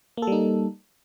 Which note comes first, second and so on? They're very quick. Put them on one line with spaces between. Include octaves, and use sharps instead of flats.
A#3 A4 G3 D#4